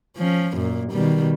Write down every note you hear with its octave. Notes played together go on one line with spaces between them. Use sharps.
F3 C#4
F#2 A#2
B2 D#3 G3